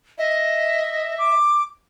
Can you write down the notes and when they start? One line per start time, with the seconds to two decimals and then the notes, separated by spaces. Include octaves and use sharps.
0.18 D#5 E5
1.18 D6